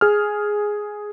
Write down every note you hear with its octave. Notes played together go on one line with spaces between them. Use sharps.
G#4 F6